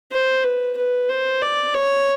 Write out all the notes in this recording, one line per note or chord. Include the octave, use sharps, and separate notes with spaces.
C5
B4
B4
C5
D5
C#5